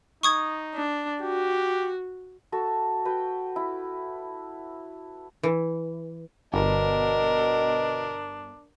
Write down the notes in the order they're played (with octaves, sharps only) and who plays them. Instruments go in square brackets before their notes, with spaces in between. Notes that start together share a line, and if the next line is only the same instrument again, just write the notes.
[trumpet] D#4 [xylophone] C#6 D#6 G#6
[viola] D4
[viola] F#4 [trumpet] G4
[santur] F#4 A4 C#6 E6
F#4 B4 G5
E4
[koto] E3
[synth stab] G1 [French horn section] B2 D#5 [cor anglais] D4 [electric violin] A#4